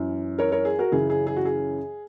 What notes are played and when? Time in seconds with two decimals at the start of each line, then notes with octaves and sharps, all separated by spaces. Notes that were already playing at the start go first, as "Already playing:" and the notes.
Already playing: F#2 E3
0.38 A#4 C#5
0.52 A#4 C#5
0.65 G#4
0.79 F#4 A#4
0.92 F#2 C#3 E3 G#4
1.10 G#4
1.27 G#4
1.37 F#4
1.45 G#4